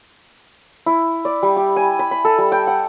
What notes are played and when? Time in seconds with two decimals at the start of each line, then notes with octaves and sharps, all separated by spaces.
0.86 E4
1.25 D5
1.43 G3
1.57 G4
1.76 G#5
1.99 B5
2.11 B5
2.25 A4
2.38 G3
2.52 G5
2.67 F#5